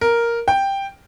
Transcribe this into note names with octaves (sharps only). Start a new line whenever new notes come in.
A#4
G5